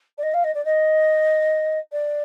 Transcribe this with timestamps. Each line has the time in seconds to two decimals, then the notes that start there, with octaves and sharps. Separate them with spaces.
0.18 D5
0.23 D#5
0.34 F5
0.44 D#5
0.54 D5
0.65 D#5
1.92 D5